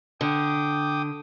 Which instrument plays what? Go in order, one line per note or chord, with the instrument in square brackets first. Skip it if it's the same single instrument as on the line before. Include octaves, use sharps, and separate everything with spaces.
[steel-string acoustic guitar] D3 [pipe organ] G5 D6 D#6